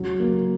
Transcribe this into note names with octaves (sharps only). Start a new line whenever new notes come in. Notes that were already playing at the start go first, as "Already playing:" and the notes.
Already playing: C#3 F#3
A#3